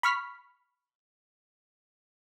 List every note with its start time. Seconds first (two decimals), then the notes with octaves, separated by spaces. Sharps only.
0.03 B5 C#6 F6 B6